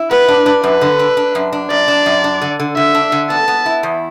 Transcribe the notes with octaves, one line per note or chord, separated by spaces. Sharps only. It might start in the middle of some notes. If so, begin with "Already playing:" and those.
Already playing: E4
B3 B4
D4
D4
F#2 B4
D3
D4
D4
F#2
D4
F#2 D5
D4
F#2
D4
D3
D3
D3 E5
D4
D3
B3 A5
B3
E4
E2